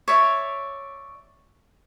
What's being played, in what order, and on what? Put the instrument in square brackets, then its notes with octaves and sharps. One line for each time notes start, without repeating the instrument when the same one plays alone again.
[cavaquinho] C#5 D5 E5